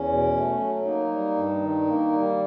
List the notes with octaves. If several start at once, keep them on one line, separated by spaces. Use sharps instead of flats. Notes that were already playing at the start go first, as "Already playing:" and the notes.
Already playing: E2 C#4
B2
A3
F#3
A#3 D#4
G3
G2
D#3
A#3
G3